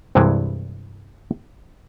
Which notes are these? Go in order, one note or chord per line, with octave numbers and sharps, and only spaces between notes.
C2 G2 C3 E3 G#3